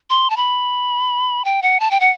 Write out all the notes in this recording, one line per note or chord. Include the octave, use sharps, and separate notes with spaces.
C6
A5
B5
G5
F#5
A5
G5
F#5